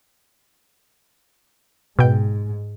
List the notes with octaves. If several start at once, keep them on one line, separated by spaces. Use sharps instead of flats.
G#2 B2 G5